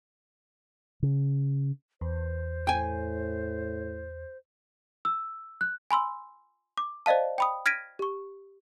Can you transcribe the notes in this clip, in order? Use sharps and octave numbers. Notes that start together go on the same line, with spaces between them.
C#3
E2 C5
A2 G5 G#5
E6
F#6
G#5 B5 C6 E6
D6
C5 D5 D#5 F5 A5
G5 B5 D#6
F6 G#6 A#6 B6 D7 D#7
G4 C#6